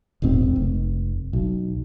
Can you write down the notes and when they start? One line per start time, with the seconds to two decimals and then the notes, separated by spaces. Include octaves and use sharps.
0.22 E1 A#1 G#2 C4
0.56 F1
1.33 B1